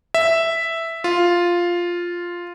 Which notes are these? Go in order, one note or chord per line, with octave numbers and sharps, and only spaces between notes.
E5
F4